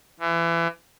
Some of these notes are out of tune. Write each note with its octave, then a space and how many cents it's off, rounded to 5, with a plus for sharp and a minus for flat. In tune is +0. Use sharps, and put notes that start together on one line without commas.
E3 +30